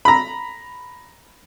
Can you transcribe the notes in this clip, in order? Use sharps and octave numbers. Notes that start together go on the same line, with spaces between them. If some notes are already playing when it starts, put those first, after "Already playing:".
A#5 B5